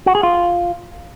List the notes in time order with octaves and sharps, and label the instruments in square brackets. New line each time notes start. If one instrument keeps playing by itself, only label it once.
[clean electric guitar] F#4
G#4
F4